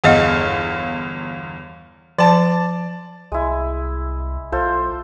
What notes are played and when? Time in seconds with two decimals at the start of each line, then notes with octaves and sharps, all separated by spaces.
0.04 G1 E2 G#4 D#5 F5 F#5
2.18 F3 D5 A5
3.32 C2 G#3 E4
4.52 B1 F4 A4 C5